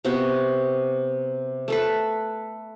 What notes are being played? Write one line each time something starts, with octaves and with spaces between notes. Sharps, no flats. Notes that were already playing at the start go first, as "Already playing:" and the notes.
C3 B3 F#4
A3 A4 B4